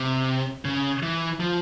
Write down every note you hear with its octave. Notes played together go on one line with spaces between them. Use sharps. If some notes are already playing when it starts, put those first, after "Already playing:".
Already playing: C3
C#3
E3
F3